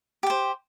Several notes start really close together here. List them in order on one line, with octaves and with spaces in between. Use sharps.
G4 G5 C5